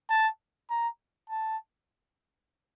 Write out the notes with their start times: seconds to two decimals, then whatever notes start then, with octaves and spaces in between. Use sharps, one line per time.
0.10 A5
0.70 A#5
1.30 A5